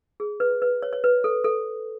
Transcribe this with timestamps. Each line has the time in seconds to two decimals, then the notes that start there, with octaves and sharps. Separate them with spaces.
0.20 G#4
0.40 B4
0.62 B4
0.82 C#5
0.93 C#5
1.04 B4
1.24 A4
1.44 A4